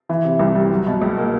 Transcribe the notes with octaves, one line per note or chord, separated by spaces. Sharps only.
E3
C3
C2
G3
F#3
B2
C#2
A#3